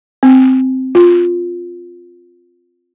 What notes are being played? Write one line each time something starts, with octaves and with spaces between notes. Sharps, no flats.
C4
F4